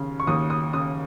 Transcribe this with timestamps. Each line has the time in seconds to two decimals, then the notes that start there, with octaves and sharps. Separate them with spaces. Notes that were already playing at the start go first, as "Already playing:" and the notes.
Already playing: D#2 C#3
0.20 C#6
0.27 D#2 D#6
0.50 D#6
0.73 C#3 D#6